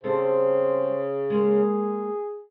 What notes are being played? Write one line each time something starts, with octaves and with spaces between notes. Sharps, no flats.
C#3 G3 C4 A4 C5
G#3 A#3 G#4